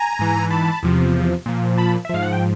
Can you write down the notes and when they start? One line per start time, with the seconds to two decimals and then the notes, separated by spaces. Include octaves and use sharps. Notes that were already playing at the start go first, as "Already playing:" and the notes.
Already playing: G#5 A#5
0.19 G#2 E3
0.50 A5 B5
0.83 E2 C3 F3
1.46 A#2 F3
1.77 A5 B5
2.05 E5
2.09 G#2 F3 F5
2.23 F#5
2.33 G5